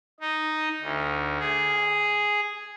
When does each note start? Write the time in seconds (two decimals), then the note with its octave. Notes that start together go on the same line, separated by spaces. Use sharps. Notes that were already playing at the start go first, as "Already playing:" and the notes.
0.20 D#4
0.81 D2
1.39 G#4